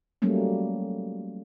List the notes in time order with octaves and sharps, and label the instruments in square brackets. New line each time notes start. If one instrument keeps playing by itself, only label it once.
[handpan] F#3 G3 A3 A#3 C#4